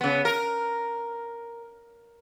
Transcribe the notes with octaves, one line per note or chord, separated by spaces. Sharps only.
C#3 B3
A#4